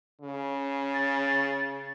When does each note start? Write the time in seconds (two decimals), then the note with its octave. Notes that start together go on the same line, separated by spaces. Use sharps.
0.21 C#3
0.94 A6